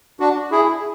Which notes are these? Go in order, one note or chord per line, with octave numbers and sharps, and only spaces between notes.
D4 F#4
E4 G#4